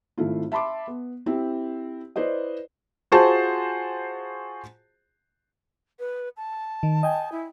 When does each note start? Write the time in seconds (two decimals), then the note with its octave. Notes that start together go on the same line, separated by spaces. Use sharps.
0.18 G#1 A3 E4 F4
0.52 E5 A5 B5 C6 D6
0.87 B3
1.26 C4 E4 G4
2.16 E4 B4 C5 D5 D#5
3.12 F4 F#4 G#4 C5 A5
5.99 B4
6.37 A5
6.83 D#3
7.03 D#5 G5 G#5
7.32 E4